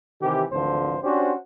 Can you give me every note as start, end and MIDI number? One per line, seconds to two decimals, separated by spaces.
0.21 0.45 48
0.21 0.45 51
0.21 0.45 52
0.21 0.45 67
0.51 0.97 32
0.51 0.97 38
0.51 0.97 50
0.51 0.97 52
0.51 0.97 53
0.51 0.97 72
1.03 1.33 61
1.03 1.33 62
1.03 1.33 66
1.03 1.33 67
1.03 1.33 72